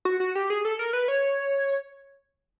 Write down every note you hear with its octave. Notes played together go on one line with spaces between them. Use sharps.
F#4
F#4
G4
G#4
A4
A#4
B4
C#5